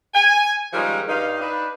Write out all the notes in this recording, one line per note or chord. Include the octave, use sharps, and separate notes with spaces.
G#5
D#3 F3 G3 G#3 C#4 D#4
G2 D#4 F5
D4 D#4 B4